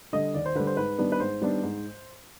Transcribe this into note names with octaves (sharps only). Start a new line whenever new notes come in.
D3 G3 D#5
D#2 D5
C5
D3 G3 B4
C5
G#2 B4
D#3 G3 B3 D4
B4
G#2 C5
D#3 G3 B3 D4
G#2